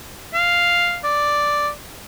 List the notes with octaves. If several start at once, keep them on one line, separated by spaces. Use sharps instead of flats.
F5
D5